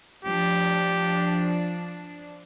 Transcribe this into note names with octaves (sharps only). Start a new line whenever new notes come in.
F3 D4 G4